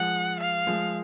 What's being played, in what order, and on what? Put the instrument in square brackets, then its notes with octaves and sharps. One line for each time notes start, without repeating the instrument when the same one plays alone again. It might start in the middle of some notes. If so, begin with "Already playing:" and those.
Already playing: [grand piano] F3 G#3 [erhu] F#5
[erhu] F5
[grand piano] F3 G#3